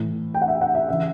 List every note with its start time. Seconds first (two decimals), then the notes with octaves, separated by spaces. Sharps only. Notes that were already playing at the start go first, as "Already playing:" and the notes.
Already playing: A2 E3
0.34 G5
0.42 F#5
0.48 E5
0.61 F#5
0.75 E5
0.89 C#3 E3 E5